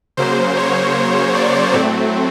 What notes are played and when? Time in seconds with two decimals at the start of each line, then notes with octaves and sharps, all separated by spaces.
0.17 C#3 F#3 A#3 C5
0.57 C#5
1.34 D5
1.73 A2 F#3 A3 C4